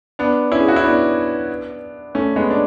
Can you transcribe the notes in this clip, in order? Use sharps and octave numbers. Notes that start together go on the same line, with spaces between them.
B3 D4
C#4 E4
G#4
F#4
E4
B3 D4
A3 C#4
G#3 B3
D4